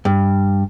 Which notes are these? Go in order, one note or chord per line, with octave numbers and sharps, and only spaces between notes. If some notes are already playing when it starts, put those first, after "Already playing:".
G2